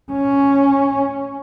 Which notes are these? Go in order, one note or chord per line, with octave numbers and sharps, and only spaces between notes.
C#4